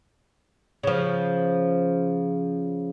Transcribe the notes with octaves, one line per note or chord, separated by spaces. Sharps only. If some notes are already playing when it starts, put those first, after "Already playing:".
C#3 F3